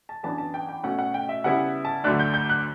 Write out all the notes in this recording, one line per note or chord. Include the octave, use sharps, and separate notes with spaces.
A5
F#2 E3 B3 D4 A5
A5
G5
G5
B2 A3 C#4 F#5
F#5
G5
E5
C#3 G3 B3 E4 F#5
A5
D2 D3 F#3 A3 D4 F#6
G6
G6
F#6